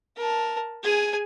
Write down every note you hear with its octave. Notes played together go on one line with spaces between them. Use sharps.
A#4 A5
G#4 G#5